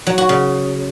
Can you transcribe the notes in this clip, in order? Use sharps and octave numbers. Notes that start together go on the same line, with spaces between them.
F#3
F#4
C#3